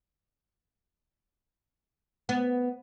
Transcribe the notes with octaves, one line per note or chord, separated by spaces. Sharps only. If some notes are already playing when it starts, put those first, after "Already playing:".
B3